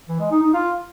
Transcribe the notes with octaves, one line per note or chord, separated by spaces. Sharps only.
E3
G#3
D#4
D#4
F4